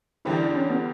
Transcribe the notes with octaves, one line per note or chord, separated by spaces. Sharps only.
E2 D3 G3 E4
D4
C#4
B3